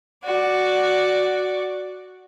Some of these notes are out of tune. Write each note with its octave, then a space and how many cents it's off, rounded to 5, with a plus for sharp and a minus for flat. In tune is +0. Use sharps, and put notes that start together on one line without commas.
F#4 +0 D5 +0